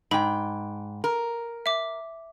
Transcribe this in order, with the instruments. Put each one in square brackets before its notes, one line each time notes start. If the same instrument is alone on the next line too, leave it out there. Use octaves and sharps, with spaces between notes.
[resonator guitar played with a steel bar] G#2 G5 [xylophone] B5
[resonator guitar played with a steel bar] A#4
[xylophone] E5 D6